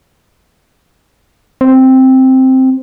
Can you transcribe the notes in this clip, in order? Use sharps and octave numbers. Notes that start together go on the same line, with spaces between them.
C4